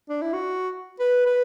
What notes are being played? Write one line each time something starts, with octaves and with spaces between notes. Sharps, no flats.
D4
E4
F#4
B4
B4